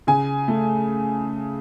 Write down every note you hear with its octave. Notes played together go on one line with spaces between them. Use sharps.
C#3 G#5
A3